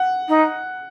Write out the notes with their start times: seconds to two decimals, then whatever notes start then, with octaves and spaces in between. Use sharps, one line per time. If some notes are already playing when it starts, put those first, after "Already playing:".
Already playing: F#5
0.29 D#4